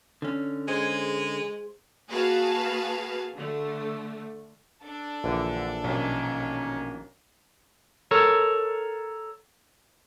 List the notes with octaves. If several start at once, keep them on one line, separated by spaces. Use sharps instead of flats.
D3 C#4
G#3 G#4 C5
A#3 F#4 G#4 B4 F5 A5
D3 A3
D4 A4
A#1 D3 E3
B1 D#3 A#3 C#4
A4 A#4 C#5